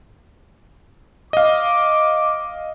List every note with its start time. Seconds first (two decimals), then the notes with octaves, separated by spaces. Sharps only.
1.33 D#5 F5 D6